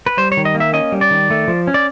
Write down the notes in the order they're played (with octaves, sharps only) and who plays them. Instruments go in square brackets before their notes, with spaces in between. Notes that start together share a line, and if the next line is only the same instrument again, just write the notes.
[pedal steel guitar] B4
G3 C5
C#5
D#3
D#5
A#3
E5
C#4 D#5
G3
D5
D#3
A3
F3
C#4
D5